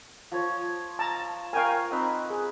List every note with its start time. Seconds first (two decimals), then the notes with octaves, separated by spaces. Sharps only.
0.32 F3 C#5
0.99 A5 A#5
1.53 A#4 C#5 F5 G5 G#5 C#6
1.91 C4 D#4 B4
2.30 G#4